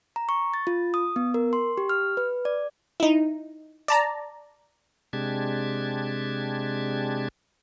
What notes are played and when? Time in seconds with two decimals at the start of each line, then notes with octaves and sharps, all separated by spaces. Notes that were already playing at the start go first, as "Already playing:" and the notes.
0.16 A#5
0.29 C#6
0.54 A6
0.67 F4
0.94 D#6
1.16 B3
1.34 A#4
1.53 C6
1.78 G4
1.89 F6
2.17 B4
2.45 D5
3.00 D#4 E4
3.88 D5 A5 A#5
5.13 C3 G#3 D4 G4 A5 G#6